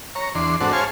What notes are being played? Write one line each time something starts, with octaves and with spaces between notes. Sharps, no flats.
C#5 A#5
E2 D4 C6
G#2 C4 D4 F#4 A4
G#4 C5 C#5 F5 G#5 A5